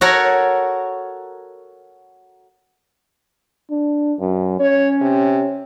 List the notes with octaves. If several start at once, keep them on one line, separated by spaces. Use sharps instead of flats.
F#4 A4 A#4 C#5 F#5
D4
F#2
C#4 C#5
C3